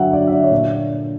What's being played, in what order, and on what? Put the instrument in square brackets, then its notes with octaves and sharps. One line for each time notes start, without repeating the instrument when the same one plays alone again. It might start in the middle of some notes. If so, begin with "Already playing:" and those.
Already playing: [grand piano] G2 D3 F#3 E5 F#5 G5
G2 D5
E5
D3 D5
C#5
A#2 D5